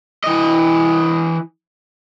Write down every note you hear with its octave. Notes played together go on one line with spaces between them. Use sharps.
E3 D#5